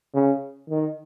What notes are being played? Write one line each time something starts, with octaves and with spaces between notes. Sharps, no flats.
C#3
D#3